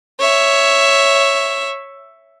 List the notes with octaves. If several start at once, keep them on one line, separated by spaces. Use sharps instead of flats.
C#5 E5